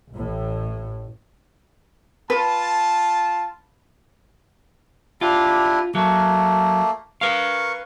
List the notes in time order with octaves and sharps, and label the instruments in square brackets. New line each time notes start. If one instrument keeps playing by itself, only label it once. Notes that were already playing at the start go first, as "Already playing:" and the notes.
[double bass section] A1 A2
[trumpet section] F4 A5 [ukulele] B4
[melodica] D4 E4 G4 [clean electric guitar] F4
[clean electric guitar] F#3 [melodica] A3 A#3
[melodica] A#4 C#6 [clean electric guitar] B4 F5